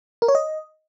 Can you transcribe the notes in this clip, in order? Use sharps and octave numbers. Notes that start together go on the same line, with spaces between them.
A#4
C#5
D#5